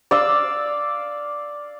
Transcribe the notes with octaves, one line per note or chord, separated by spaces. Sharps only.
D5 F5 E6